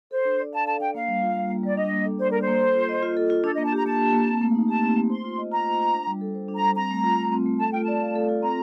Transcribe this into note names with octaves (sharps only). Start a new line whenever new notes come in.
A4 C5
D4
D5
F5 A5
A4 A5
D4 G5
A#3 F5
G3
F4
G3
A#3
G3 D5
D4 D#5
A#3
A4
C5 D5
D4 A#4
C5
A#3
A4
F4
D#5
F4
A4
F4
D4 A4
D#5
A#3
A5
G4 A#5
A#3 A5
D4
A#3
C4
A3
D#4
G4 A5
C4
A3
C5 C6
F4
D#5
F4 A#5
C5
F4
D4
G3
A4
C5
D4
A#5
G3
C4 A#5
A3
F4
A3
C4
A3
A4 A5
F4 G5
D5 A5
F5
A4
F4
C4 A#5